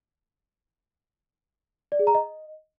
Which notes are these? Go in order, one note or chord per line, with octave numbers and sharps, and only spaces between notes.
D5
G#4
A#5
D#5